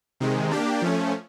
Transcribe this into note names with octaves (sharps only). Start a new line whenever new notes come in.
C3 D#3 G#3
A#3 D4 G4
F3 A3 C#4